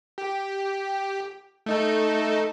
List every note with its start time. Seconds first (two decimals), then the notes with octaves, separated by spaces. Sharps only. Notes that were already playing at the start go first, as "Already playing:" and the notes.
0.18 G4
1.66 A3 D#4 A4